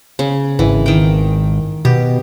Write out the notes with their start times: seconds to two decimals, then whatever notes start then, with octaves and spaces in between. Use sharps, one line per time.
0.19 C#3
0.59 G#1 E3
0.86 D#3 G5
1.85 B2 G4